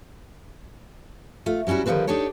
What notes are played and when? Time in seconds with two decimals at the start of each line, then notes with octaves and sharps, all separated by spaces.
1.46 A3 F4
1.67 F#3 G3 C#4 E4 F#4
1.86 D3 D#3 F3 G3 C4 B4
2.07 D4 D#4 G4 A4 C#5